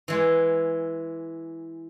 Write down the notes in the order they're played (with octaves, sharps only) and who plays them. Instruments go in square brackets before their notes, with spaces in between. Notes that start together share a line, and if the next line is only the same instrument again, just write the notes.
[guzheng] E3 G#3